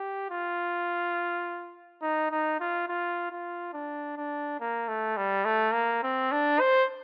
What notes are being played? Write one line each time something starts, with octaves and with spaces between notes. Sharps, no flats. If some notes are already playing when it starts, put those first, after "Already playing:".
Already playing: G4
F4
D#4
D#4
F4
F4
F4
D4
D4
A#3
A3
G3
A3
A#3
C4
D4
C5